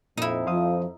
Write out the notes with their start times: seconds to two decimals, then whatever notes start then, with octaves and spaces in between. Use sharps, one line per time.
0.17 F2 A#2 D#4 E4
0.47 F3 C5 F5 D#6